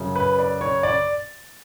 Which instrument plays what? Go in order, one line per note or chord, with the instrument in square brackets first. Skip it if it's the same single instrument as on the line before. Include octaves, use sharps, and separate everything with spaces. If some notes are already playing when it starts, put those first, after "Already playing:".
Already playing: [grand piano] F#2 C#3 F#3
B4
D5
C#5
D5